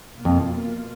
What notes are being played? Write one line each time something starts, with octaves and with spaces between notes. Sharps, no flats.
B2 A#3 F4
F2